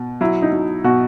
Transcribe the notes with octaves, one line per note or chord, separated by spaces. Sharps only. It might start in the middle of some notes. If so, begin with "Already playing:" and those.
Already playing: B2
F#3 E4
D#4
F#3
B2 F#4